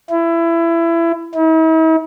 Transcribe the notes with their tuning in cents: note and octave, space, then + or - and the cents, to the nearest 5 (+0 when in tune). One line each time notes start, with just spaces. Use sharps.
E4 +25
E4 -45